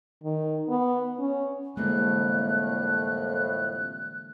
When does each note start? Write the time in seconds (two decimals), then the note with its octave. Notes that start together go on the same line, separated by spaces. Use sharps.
0.24 D#3
0.69 B3
1.19 C#4
1.77 C2 F2 A2 D3 E3 G#3 A#3 F#6